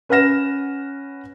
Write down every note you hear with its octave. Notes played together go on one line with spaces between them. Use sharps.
C#4 B4 F#5 F6 A#6 E7